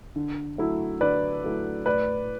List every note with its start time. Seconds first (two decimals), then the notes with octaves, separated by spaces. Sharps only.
0.16 D3
0.58 F#3 A3 E4
1.01 D3 B4 D5
1.44 F#3 A3 E4
1.86 A2 B4 D5